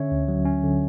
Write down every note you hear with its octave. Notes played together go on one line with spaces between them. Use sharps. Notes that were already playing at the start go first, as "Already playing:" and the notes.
Already playing: D3 C#4 C#5 E5
D2
F#3
C#4
D3